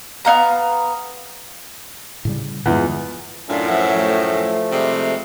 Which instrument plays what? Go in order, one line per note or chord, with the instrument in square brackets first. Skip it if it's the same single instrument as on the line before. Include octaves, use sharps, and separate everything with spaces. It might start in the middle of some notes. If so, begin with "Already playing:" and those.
[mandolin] B3 D#4 F5 A#5
[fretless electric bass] A2 C#3 G3
[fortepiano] E2 [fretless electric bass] G2 D3 [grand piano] F3 G#3
[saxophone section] F#2 A2 [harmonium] D4 F4
[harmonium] F3 E5 F#5
F3 A3
[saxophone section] C3 G3 G#3